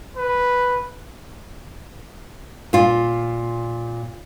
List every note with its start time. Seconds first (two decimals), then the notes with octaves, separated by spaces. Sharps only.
0.17 B4
2.73 A#2 F4